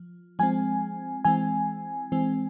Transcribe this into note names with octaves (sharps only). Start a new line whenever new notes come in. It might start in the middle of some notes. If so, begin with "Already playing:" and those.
Already playing: F3
F3 G#3 C4 G#5
E3 G#3 C4 G#5
E3 G#3 C4